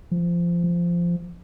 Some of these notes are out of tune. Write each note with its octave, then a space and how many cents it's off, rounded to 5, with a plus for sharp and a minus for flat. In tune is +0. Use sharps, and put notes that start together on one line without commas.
F3 -20
F3 -15